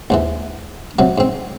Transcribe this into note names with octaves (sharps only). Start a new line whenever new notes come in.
D#2 G#2 E3
C3 F#3
G#2 C4